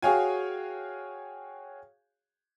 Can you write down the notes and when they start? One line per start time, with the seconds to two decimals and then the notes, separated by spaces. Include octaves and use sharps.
0.02 F#4 G#4 C#5 F5 G5 G#5